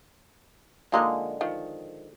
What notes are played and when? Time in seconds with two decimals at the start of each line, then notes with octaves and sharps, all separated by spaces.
0.92 D3 F3 G#3 A#3 D#4 A#5
1.41 D#3 F3